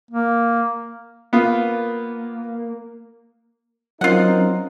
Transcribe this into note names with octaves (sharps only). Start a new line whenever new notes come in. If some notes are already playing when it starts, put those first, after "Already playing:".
A#3
A#3 B3 F4
F#3 C4 C#4 D#4 F4 A#4 F#5